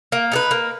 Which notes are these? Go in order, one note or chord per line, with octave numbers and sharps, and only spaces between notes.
A#3
D#4 G#4 B4
A#3